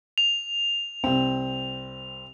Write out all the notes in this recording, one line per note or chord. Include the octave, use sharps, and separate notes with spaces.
F7
C2 C4